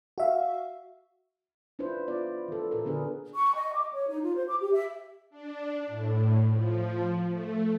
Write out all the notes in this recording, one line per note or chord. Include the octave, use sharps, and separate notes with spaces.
F#4 E5 F5
D4 E4 F4 B4 C5
B3 F4 D5
E3 A4
A#2 A4 A#4
D3 B3 D4 G#4 B4
C#6
D#5
D6
C#5
D#4
F4
C5
D6
G4
E5
D4
A2
F3
A3